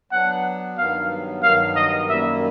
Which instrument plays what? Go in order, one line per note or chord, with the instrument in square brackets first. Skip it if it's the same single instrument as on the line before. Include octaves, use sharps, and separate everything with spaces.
[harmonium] F#3 B3 D4 [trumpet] F#5
[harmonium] G2 D#3 F#3 B3 [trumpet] F5
[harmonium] G2 D#3 F#3 B3 [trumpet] F5
[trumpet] D#5
[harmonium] F#2 D#3 G3 A#3 [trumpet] E5